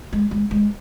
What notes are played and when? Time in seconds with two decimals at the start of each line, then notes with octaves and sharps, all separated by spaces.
0.13 G#3
0.31 G#3
0.51 G#3